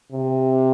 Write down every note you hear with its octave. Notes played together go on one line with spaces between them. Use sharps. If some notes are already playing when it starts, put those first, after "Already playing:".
C3